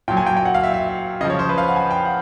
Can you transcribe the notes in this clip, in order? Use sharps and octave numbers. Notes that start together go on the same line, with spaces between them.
A#2 F#3 G5
G#5
G5
G5
F#5
F5
E5
E5
C#3 F3 D#5
C#5
C5
B4
F5
F#5
G#5
G5
F#5